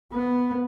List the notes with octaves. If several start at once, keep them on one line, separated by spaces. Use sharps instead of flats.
B3